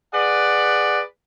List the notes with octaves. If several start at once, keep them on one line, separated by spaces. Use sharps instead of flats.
G#4 B4 D5 F#5